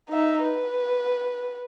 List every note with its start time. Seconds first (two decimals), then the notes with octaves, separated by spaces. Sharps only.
0.10 D#4 E5
0.43 B4